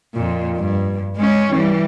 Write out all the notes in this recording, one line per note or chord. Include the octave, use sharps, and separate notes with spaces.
F2 A#2
G2
G#3 C#4
E3 G3